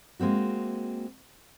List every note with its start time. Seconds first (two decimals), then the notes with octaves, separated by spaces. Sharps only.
0.19 G#3 A#3 C4 F#4